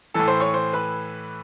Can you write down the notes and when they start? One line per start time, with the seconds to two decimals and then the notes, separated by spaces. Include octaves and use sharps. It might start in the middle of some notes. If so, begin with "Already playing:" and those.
0.14 A2 E3 A4 A5
0.28 C5 C6
0.40 C#5 C#6
0.54 C5 C6
0.73 B4 B5